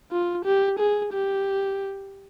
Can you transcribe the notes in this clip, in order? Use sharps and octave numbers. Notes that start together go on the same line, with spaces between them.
F4
G4
G#4
G4